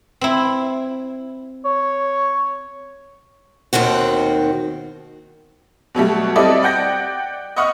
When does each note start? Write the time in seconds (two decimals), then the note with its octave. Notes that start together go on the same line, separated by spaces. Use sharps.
0.21 C4 E4
1.65 C#5
3.73 D#2 B2 D#3 C4 F#4
5.95 B2 F#3 G3 A3
6.36 G3 C4 E4 A4 D5 D#5
6.63 D5 F#5 G5 G6 A#6
7.56 D#5 E5 F#5 C#6 D#6 F6